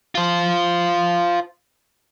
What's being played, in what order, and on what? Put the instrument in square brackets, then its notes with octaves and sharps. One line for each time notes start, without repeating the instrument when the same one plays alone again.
[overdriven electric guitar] F4 C5